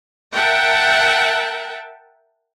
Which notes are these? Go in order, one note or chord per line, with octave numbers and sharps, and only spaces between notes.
A#4 E5 F#5 G5 A5